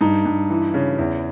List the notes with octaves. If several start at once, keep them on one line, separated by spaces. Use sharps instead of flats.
G2 D#4
G2
E3
C#3
E2